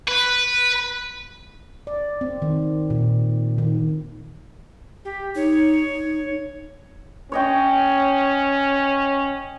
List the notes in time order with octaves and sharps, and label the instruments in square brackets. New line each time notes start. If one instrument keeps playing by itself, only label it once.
[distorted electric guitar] B4
[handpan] D5
C4
D#3
A#2
D#3
[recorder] G4
[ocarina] D#4 [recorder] C#5
[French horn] C#4 [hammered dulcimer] C#5 D#5 G5